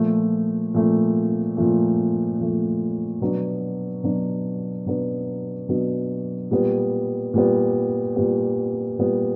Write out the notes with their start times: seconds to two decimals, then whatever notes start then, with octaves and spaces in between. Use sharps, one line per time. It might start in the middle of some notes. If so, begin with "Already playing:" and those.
Already playing: A#2 F3 A3
0.74 A#2 F3 A3
1.57 A#2 F3 A3
2.39 A#2 F3 A3
3.21 B2 F#3 B3 D4
4.04 B2 F#3 B3 D4
4.86 B2 F#3 B3 D4
5.69 B2 F#3 B3 D4
6.51 A#2 G3 B3
7.34 A#2 G3 B3
8.16 A#2 G3 B3
8.99 A#2 G3 B3